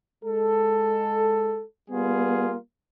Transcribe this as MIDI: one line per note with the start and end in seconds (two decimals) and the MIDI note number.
0.23 1.63 56
0.23 1.63 69
1.90 2.55 55
1.90 2.55 58
1.90 2.55 59
1.90 2.55 65
1.90 2.55 68